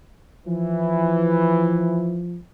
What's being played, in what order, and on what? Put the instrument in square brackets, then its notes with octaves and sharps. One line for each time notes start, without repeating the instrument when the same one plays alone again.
[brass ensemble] E3 [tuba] F3